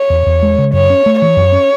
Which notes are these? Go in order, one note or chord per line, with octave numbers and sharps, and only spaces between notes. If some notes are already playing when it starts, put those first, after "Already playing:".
Already playing: C#5
E2
E2
G#3
C#3
F#2 C#5
C#4
A3
E3 C#5
F#2
C#4